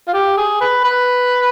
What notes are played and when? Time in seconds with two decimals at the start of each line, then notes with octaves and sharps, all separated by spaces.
0.07 F4
0.14 G4
0.37 G#4
0.60 B4
0.84 B4